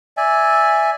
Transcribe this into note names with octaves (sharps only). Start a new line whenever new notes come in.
D5 E5 G#5